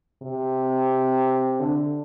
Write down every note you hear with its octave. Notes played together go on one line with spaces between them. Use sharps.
C3
D3